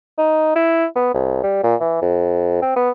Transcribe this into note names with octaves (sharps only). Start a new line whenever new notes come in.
D#4
E4
B3
C2
G3
A#2
E3
F2
C4
B3